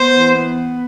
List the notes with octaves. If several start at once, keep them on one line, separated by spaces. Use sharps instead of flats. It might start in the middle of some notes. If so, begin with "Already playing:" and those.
Already playing: B3 C5
E3
B3